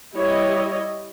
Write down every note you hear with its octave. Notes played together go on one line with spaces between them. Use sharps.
G3 E4 C#5 D#5